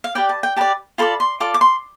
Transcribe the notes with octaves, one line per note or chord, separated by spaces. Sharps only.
F5
G4 B4 D5 G5
A5
G5
G4 B4 D5 A5
F4 A4 D5 B5
C6
F4 A4 D5 D6
D6
C6